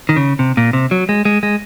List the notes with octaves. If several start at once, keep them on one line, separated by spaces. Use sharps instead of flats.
D#3
C#3
C3
A#2
C3
F#3
G#3
G#3
G#3